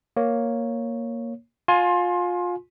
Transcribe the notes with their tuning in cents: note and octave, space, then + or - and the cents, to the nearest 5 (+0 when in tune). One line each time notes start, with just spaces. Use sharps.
A#3 +0 C#5 +0
F4 +25 G#5 +25 C6 +20